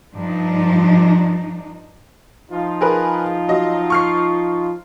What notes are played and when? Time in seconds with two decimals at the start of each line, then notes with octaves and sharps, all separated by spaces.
0.14 G2 F3 D4 D#4
2.51 F3 D#4 F4
2.81 G#4 A#4 B4
3.48 F#3 D#5
3.90 C#6 F6 C7